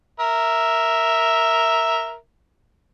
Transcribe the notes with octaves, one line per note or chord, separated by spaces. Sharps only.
A#4 E5